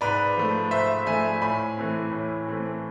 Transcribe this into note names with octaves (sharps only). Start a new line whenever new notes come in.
G#2 B4 D5
F3 A3
G#2 C5 E5
F3 A3 E5 G#5
A2 G#5 B5
E3 A3 C4
A2
E3 A3 C4